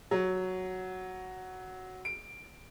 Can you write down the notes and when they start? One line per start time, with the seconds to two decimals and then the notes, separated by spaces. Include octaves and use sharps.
0.11 F#3
2.05 D7